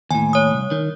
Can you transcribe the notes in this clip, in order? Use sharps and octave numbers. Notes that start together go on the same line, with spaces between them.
D#2 A2 G#5
C#5 D#6
C2
D#3